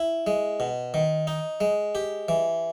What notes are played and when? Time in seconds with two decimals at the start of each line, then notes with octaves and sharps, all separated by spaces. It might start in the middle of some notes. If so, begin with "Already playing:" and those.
Already playing: E4
0.27 G#3
0.60 B2
0.94 D#3
1.27 D#4
1.61 G#3
1.95 G4
2.28 E3